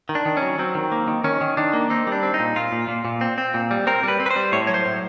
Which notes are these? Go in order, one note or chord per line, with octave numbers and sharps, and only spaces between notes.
D#3
D4
D#3
C#4
F#3
F#3 C4
D#3
A#3
D#3
D#3 C#4
D#3
D#3 D4
A#3
C4 D#4
G3
D4
C4
D#4
A#2
A#2 F4
A#2
A#2
A#2
C4
C4
A#2
G3
C4 A#4
G3 B4
C4
B4
C5
G3
A2 C#5
F#3 C#5
C5
A2